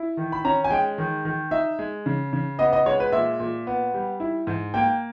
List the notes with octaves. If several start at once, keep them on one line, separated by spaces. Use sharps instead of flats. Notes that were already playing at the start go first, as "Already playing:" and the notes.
Already playing: E4
D#3
B5
C#4 A#5
G#5
G#3 G5
D#3
D#3
D#4 E5
G#3
C#3
C#3
B3 D#5
D#5
G#3 C#5
B4
A#2 E5
A#2
B3
G3
E4
G#2
A#3 G5